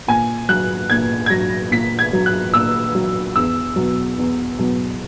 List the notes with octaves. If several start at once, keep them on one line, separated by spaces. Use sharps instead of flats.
A#2 G#5
F#3 F#6
A#2 G#6
G#6
F#3 A#6
A#2 B6
G#6
F#3
F#6
A#2 E6
F#3
E2 E6
B2 F#3
E2
B2 F#3